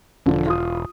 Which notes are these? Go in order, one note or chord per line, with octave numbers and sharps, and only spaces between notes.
E1 D3 F3
F4 D#6